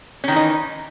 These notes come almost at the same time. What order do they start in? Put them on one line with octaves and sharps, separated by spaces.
C#4 D#3 E3 D#4